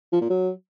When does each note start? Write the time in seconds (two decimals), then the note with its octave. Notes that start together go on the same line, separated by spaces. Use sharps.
0.13 F3
0.21 A#2
0.30 F#3